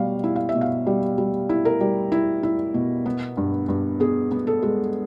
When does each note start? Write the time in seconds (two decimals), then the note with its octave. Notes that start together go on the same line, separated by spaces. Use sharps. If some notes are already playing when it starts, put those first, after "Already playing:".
Already playing: B2 G3 F5
0.24 E4
0.36 F5
0.49 E5
0.55 B2
0.61 F5
0.87 G3
1.18 G3
1.49 E4
1.65 A#4
1.81 G3
2.12 E4
2.43 E4
2.74 B2
3.06 B3
3.37 G2
3.68 G2
4.00 B3 G#4
4.31 B3
4.47 A4
4.62 G#3